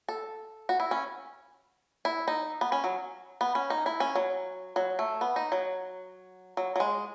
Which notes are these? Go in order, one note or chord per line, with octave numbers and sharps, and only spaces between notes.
A4
F#4
E4
C#4
E4
D#4
B3
C#4
F#3
B3
C#4
D#4
E4
C#4
F#3
F#3
A3
B3
D#4
F#3
F#3
F#3
G#3